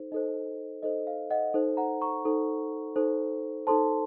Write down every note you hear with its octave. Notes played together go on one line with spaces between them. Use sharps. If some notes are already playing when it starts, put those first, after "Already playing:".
Already playing: D#4 A4 C5
D#4 A4 C5 D#5
D#4 A4 C5 D#5
F5
D#5 F#5
D#4 A4 C5
F#5 A#5
A#5 C#6
D#4 A4 C5
D#4 A4 C5
D#4 A4 C5 A5 C6